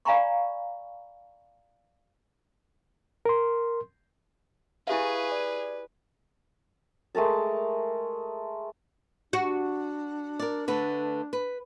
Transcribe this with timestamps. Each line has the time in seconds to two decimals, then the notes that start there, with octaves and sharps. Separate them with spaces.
0.05 D5 F5 G#5 A#5 B5 C#6
3.25 A#4 C6
4.87 E4 G4 G#4 B4 E5 F5 G#5 C#6
5.31 D5
7.15 G#3 A3 A#4 A5
9.33 D4 F#4
10.39 A#4 D5
10.68 D3 A3 B4
11.33 B4